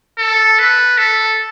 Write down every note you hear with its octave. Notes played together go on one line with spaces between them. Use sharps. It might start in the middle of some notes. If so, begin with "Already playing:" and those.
A4
B4
A4